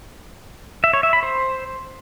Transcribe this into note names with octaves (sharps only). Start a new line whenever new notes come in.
E5
C#5
E5
B5
C5